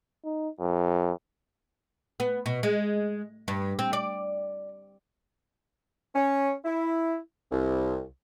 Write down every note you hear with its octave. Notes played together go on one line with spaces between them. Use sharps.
D#4
F2
B3
B2
G#3
G2
C4
D5
C#4
E4
C2